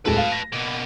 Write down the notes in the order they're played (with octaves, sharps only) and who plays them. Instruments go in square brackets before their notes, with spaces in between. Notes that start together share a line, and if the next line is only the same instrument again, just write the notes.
[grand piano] D1 G#3 A4 [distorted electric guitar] B4 A5
[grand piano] F5
A#6
[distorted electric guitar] B2 A#3